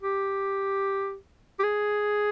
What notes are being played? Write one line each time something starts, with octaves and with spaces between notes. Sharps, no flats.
G4
G4
G#4